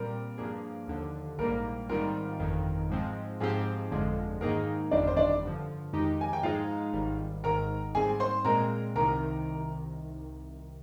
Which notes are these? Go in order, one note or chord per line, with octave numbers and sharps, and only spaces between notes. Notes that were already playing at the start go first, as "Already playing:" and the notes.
Already playing: A#2 G3 C4 A#4
G2 F3 A#3 D4 G#4
D#2 D3 F3
A#1 G#2 G3 A#3 A#4
G#2 D#3 G3 C4 F4 A#4
G1 F2 D#3
G#2 F3 G#3 C4
G#2 F3 C4 G4 G#4
G1 F2 D3 F3 G#3
G#2 D#3 A#3 D#4 G#4 A#4
G1 F2 D#3 G3 C4 D4 D5
C5
D4 D5
G2 D3 F3
F2 D#3 G#3 D#4 G4
G#5
G5
G#2 F3 G#3 D#4 F4 G#4 F5
G#1 G#2 D#3 G3
G#1 G#2 D#3 A#4 A#5
G#2 G3 C4 G#4 G#5
C5 C6
A#2 G#3 C4 A#4 A#5
C2 C3 D#3 A#4 A#5